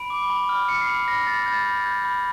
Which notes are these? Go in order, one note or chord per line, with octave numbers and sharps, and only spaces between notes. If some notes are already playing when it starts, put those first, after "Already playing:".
Already playing: B5 D7
D6
B5
F6
F6 C#7
C7
B5
B5 A#6
B5 A6
G6 A6
B5
G6 G#6
B5